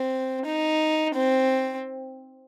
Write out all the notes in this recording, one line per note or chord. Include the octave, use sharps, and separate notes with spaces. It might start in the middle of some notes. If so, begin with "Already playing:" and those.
Already playing: C4
D#4
C4